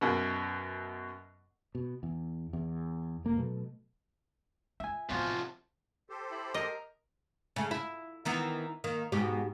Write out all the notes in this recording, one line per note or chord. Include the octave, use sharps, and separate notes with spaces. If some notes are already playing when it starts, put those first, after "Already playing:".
F#2 B2
B2
E2
E2
F1 A#3
B2 F#3 A3
D#4 F4 E5 G#5
A1 C3 F3 B3 F4 F#4
G4 A4 C5
E4
A#4 D#5
C#3 A3
E4
D#3 E3 B3
D#3 A#3
G#2 B2 G4